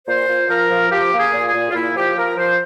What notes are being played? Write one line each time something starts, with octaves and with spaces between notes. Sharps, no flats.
A#2 C5
A#2
F3 A#4
F3
F3 G4
A#3
G#4
A#2
G#4
A#2
F4
A#2 E4
F3 G4
F3 A#4
F3 C5